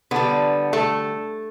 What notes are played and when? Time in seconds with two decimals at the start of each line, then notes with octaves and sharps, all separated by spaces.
0.11 D3 G3 B3
0.73 A3